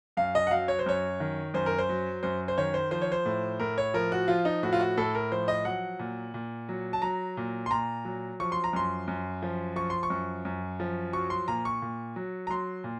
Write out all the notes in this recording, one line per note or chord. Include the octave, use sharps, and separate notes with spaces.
F#2 F5
D#5
F#5
F#3 F5
C#5
C5
F#2 C#5
D#3
F#2 C5
A#4
C5
F#3
F#2 C5
C5
D#3 C#5
C5
F3 C5
C#5
C5
A2
A2 A#4
C#5
F3 A#4
F#4
F3 F4
D#4
A2 F#4
F4
F#4
A2 A4
A#4
F3 C5
D#5
F#3 F#5
A#2
A#2
F#3
A5
F#3 A#5
A#2
C6
A#2 A#5
F#3
F3 C#6
C6
A#5
F#2 C6
F#2
F3
F3 C#6
C6
C#6
F#2
F#2
F3
F#3 C#6
C6
A#2 A#5
C#6
A#2
F#3
A#5
F#3 C6
A#2